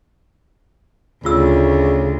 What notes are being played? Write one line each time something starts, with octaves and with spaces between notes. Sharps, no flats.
D2 C#3 F4 E6